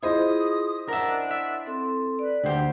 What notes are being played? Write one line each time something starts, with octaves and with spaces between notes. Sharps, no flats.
E4 F4 G#4 C5 D#5 D#6
D4 A#4 E5 F#5
E5
C4 A4 C6
B4 D5
D2 G4 C5 F#5